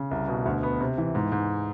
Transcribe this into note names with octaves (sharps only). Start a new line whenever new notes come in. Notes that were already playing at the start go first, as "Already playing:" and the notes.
Already playing: C#3
C2
B2
D2
B3
C3
E3
G#2
G#2